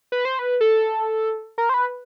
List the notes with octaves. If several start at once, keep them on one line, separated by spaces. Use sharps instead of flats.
B4
C5
B4
A4
A#4
C5
B4